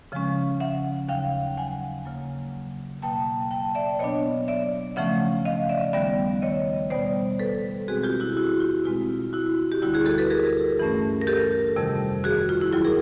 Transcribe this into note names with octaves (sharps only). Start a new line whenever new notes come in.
C#3 F3 G#3 C#4
E5 F#5
D#2 C#3 F#3 F5 G5
F#5 G#5
C#3 F#3 A#3
B2 F#3 A#3 G5 A5
G5 A5
D5 E5
B2 F#3 B3 D4 C#5 D#5
D5 E5
C#3 F3 A3 C#4 E5 F#5
D#5 F5
D5 E5
D#2 D#3 G3 B3 D5 E5
C#5 D#5
B2 G3 B3 C5 D5
A4 B4
B2 G#3 C4 F#4 G#4
F4 G4
E4 F#4
E4 F#4
F4
B2 G#3 C4 F4
E4 F#4
G4
D2 D3 G3 E4 F#4
F#4 G#4
G4 A4
A4 B4
G#4 A#4
G2 E3 A3 C#4
A#4
G4 A4
F2 C3 D#3 G3
F#4 G#4
F4
E4
D#2 D#3 F#3 F4
G#4 A#4